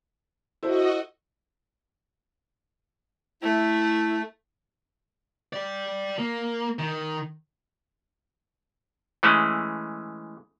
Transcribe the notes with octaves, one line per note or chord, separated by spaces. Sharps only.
E4 F#4 A4 C5 D#5
A3 E4
G4 D5
A#3
D#3
E3 G#3 A3 C#4